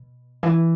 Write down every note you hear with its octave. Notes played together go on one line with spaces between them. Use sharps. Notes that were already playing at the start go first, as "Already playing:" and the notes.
Already playing: B2
E3